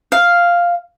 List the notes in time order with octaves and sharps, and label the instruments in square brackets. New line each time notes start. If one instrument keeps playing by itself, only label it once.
[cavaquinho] F5